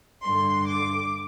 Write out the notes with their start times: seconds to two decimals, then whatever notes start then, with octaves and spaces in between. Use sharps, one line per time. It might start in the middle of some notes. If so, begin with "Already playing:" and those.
0.22 G2 D3 C6
0.67 D6